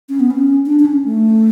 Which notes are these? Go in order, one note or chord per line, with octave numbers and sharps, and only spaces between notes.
C#4
B3
C#4
D4
D4
C#4
A3